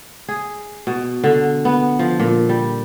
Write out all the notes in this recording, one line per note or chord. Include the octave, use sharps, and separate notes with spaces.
G#4
B2
D3
B3
F3
A#2
G3